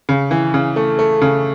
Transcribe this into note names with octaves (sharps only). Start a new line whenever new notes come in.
C#3
E3
C#3
A3
A3
C#3